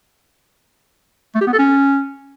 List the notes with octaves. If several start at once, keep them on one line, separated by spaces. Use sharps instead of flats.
A3
G4
B3
A4
C#4